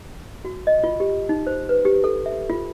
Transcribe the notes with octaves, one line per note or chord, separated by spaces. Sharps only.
F#4
D#5
F4
G4
D#4
C5
B4
G4
A4
E5
F4